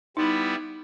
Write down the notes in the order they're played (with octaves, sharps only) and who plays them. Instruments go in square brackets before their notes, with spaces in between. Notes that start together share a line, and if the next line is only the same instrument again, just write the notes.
[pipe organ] G3 B3 E4 [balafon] D#4